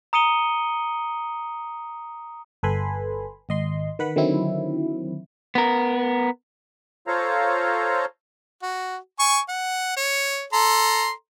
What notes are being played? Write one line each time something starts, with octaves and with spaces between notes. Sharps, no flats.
A#5 D#6 C#7 D#7 G7
G1 A4 B4 G#5 B5 C6
G#1 D#5 C6
D#3 B4 F#5 B5
D3 D#3 F#3 C4 E4
B3 A#4
F4 A4 C5 C#5 F5 A#5
F#4
G#5 C#6
F#5
C#5
A4 A#5 C6